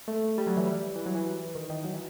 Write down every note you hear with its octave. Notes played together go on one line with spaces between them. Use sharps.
A3
G3
F#3
E3
G3
E3
F#3
E3
D#3
D#3
F#3
E3